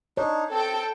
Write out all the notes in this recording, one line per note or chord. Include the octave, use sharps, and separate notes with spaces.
D4 D#4 C#5
C4 A4 G5